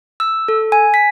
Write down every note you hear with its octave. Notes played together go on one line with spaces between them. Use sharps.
E6
A4
G#5
B6